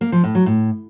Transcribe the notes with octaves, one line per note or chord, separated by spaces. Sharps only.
A#3
F3
A2
F#3
A2